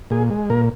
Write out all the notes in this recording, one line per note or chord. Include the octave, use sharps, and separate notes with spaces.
A#2 G#4
G#3
A#2 A#4